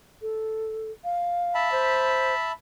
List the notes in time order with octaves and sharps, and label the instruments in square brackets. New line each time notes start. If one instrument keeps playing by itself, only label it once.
[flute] A4
F5
[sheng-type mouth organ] E5 A5 B5
[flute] C5